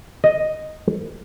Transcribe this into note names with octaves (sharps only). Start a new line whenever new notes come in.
D#5